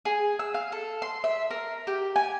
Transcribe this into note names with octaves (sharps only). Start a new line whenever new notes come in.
G#4
E6
F5
A4
C6
E5
A#4
G4
G#5